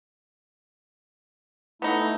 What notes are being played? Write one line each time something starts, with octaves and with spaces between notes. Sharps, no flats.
A3 B3 D#4 E4